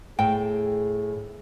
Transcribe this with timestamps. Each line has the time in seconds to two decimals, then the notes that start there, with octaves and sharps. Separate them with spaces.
0.19 A2 G#4 G5